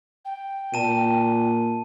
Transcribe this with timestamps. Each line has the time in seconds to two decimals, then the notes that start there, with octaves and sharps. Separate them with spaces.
0.25 G5
0.74 A#2 A5 D#7